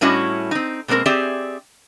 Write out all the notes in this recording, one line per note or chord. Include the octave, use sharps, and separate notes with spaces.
A2 G3 C#4 E4 F#4 D#5
C4 D#4
B2 G#3 A#3 C4 A#4
C4 G4 G#4 D5 E5